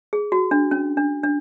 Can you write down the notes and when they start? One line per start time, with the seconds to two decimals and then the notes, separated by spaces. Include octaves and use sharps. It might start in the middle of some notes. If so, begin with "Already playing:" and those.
0.13 G#4
0.32 F#4
0.51 D4
0.71 C#4
0.97 D4
1.24 D4